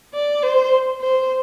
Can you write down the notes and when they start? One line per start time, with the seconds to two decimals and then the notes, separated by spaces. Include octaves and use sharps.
0.14 D5
0.43 C5
1.01 C5